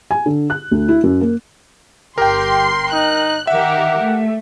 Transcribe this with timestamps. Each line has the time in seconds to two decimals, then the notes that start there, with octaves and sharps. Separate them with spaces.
0.11 G#5
0.26 D3
0.50 F#6
0.71 D2
0.88 E4
1.04 F#2
1.21 A#3
2.18 G1 G4 A#4 G5 C6
2.93 D#4 F#6
3.47 D#3 G4 A#4 E5 F#5
3.99 A3